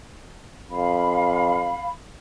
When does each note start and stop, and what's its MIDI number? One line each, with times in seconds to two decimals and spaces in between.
0.70 1.76 41
0.70 1.88 77
0.70 1.88 83